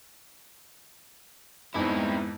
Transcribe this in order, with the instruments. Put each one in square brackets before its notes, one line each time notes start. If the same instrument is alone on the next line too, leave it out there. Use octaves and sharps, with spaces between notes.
[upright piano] F2 G#2 E3 [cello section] G#3 D#4 [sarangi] B3 [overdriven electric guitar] C4 E4